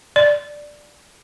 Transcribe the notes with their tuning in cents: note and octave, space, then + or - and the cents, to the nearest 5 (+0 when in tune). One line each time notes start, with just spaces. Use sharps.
D5 +5